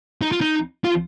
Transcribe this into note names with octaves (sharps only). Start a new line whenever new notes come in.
D#4
F4
D#4
F4